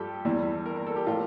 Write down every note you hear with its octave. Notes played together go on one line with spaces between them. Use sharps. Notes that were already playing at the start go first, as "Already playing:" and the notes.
Already playing: G2 F3 G4 A4
E2 E3 G3
A#4
A#4
A4
G4
A2 F3 A3 F4